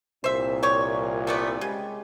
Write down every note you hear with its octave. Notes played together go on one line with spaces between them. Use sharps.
C2 A#2 C5 E5
G4 C#5
A3 B3 D5
C#3 G#3 G4